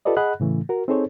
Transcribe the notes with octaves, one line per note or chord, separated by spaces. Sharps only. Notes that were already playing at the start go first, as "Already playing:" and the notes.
F4 G4 A4 B4 D5 D#5
G#4 D#5 F#5 B5 F#6
A2 C#3 E3 A3
F#4 A#4
C4 D#4 G#4 A4 C5 C#5